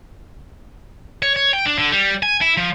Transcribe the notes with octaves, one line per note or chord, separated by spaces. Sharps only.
C#5
C#5
G5
D4
D3
G3
G#5
E4
F3